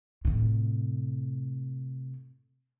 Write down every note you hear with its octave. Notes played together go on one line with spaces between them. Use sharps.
A2 C3